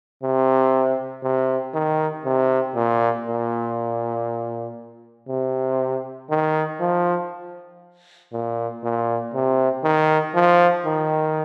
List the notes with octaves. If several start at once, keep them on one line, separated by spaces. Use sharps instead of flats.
C3
C3
D#3
C3
A#2
A#2
C3
D#3
F3
A#2
A#2
C3
D#3
F3
D#3